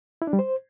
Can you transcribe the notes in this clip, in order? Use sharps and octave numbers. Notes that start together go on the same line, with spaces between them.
E4
D4
G3
C5